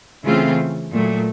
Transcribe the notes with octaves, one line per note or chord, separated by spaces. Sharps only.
C#3 E3 A3 C4 F4
A#2 F#3 A3